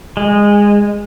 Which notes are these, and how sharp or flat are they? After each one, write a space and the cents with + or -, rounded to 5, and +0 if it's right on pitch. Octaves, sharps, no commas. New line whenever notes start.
G#3 -15